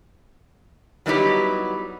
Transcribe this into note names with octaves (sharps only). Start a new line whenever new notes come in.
F#3 G3 B3 D#4 E4 G4